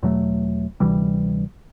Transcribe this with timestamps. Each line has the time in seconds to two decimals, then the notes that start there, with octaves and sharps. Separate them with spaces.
0.03 E2 B2 F#3 A3
0.80 D2 C3 E3 G3